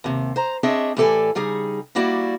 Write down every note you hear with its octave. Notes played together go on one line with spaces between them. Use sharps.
D#2 C3
C5 A#5
C4 D4 G#4 C#5 D#5 E5
A2 E3 G4 A4 D5 G#5
C#3 G3 D#4 G#4
G3 A#3 E4 F#4 D5